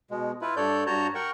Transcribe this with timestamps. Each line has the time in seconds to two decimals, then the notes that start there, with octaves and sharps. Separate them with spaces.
0.11 B2 G#3
0.42 E4 F4 B4
0.56 G2 A4 C#5 D5 G6
0.87 G2 F#4 C#5 A5 A#5 G6
1.15 A#4 F#5 G5 C#6